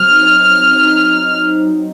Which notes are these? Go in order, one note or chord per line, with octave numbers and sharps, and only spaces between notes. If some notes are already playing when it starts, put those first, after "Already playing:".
Already playing: F#3 C4 F6
D#4
C4
F#3
D#4
D#4